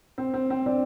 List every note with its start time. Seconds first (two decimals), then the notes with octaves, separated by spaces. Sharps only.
0.18 C4
0.34 C4
0.50 C4
0.66 C4 D4